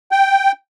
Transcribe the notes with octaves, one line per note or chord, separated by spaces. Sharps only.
G5